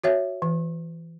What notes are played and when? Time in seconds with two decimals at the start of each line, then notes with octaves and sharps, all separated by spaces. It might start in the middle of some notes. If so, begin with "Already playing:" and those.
0.04 F#4 C#5 E5
0.42 E3